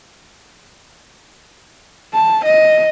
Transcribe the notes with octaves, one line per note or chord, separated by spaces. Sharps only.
A5
D#5